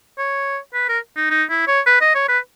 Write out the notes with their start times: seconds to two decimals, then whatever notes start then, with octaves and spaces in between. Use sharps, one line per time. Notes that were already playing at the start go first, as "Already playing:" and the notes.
0.18 C#5
0.74 B4
0.89 A#4
1.17 D#4
1.30 D#4
1.50 E4
1.67 C#5
1.86 B4
2.01 D#5
2.15 C#5
2.29 B4